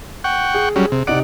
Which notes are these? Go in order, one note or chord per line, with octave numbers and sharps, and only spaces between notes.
F#5 G5 C#6
G#4
F#3 G3 C#4
C3
C3 D#4 D5 F#5 D7